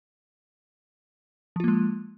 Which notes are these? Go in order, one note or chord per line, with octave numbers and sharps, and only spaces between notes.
F3 G#3 A#3 F4